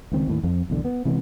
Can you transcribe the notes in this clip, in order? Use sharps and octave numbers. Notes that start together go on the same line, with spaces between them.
C#2 D#3 C4
D#2 A2
F2
B1 E2 D3
B3
C3 E3 G#3 B3